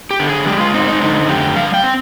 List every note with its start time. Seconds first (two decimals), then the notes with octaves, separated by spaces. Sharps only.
0.11 G4
0.19 D3
0.29 G#4
0.47 G#3 G4
0.60 F4
0.74 C4 D#4
0.88 D#4
1.02 D3 D#4
1.28 F2 G4
1.56 G3 F5
1.74 G5
1.84 C4